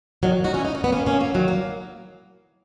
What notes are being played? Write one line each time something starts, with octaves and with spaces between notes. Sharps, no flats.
D#3 F#3
D#4 F#4
C#4 E4
D#4
C#4
B3
A#3 C#4
A#3 C#4
F#3 A#3
D#3 F#3
A#3